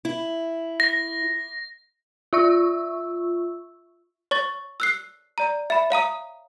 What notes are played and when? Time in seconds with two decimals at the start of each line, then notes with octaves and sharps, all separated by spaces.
0.05 E4
0.80 A#6
2.33 F4 E5 C#6 E6
4.31 C#5 C#6 A6
4.80 E6 F#6 C7
5.38 D5 A#5
5.70 E5 B5
5.90 C#5 F5 A#5 D#6